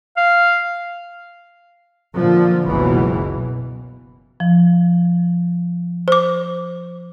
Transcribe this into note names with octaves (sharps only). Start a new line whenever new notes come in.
F5
A#2 D3 F3
F#1 C#2 B2 E3 F#3
F3
C5 D6